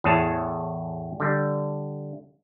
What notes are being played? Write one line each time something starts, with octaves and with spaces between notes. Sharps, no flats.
E2 A2 G#4 C#5 A5
D3 G3